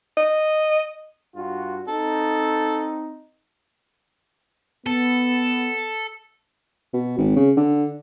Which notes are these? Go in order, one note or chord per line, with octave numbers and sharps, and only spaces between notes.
D#5
G2 F4 F#4
C4 D#4 A4
B3 A4
B2
G#1
C#3
D3